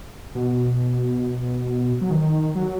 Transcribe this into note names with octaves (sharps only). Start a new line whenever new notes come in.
B2
F#3
D#3
F#3